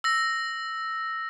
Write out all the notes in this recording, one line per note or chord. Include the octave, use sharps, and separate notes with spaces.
E6 A#6